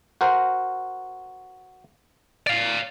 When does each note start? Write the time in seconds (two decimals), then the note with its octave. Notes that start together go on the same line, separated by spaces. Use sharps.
0.21 F#4 A#4 C5
2.47 D5 F5